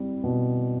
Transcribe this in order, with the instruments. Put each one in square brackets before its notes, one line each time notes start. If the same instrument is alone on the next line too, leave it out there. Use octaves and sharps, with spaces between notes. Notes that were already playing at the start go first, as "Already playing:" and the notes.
Already playing: [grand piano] G3 C4 E4
B2